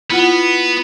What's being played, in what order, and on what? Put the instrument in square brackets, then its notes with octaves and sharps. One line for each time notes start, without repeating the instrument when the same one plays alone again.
[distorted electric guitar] B3 [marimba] E4 F4 F#5